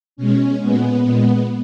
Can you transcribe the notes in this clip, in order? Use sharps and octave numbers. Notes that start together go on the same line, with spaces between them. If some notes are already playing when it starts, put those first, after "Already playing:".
B2 G#3 C#4
A#2 G#3 B3
A#2 G#3